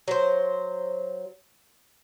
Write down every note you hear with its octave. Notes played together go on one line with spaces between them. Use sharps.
F#3 C5